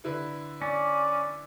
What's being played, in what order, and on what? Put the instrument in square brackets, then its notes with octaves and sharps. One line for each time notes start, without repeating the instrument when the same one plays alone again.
[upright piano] D3 E4 B4
[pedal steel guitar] C#4 [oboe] D5